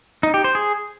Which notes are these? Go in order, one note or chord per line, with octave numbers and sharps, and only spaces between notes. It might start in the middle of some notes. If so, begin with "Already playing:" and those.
D#4
G4
C5
G#4